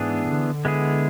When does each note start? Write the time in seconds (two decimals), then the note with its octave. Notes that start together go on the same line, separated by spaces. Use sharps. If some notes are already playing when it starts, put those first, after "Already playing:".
Already playing: G#2 E3 B3 D4 G#4
0.27 D3
0.65 G#3 B3 E4 G#4